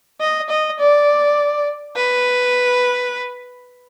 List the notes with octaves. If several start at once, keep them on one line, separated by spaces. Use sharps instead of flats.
D#5
D#5
D5
B4